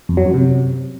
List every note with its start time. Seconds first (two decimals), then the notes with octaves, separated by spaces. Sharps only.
0.09 F2
0.17 F#3
0.26 F#2
0.34 C3